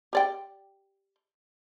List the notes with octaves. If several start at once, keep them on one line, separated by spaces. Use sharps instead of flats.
G4 D5 G5